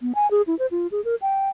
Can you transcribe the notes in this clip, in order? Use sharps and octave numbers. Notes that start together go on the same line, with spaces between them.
B3
G#5
G#4
E4
C5
F4
G#4
A#4
G5